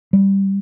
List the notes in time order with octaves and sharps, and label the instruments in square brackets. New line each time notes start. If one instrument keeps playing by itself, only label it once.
[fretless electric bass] G3